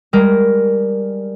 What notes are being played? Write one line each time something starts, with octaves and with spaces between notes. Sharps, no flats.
G3 G#3 A#4